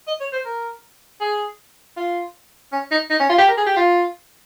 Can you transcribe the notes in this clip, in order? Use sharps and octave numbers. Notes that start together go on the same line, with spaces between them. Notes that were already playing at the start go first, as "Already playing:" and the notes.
D#5
C#5
C5
A#4
G#4
F4
C#4
D#4
D#4
C#4
F4
G4
A#4
G#4
G4
F4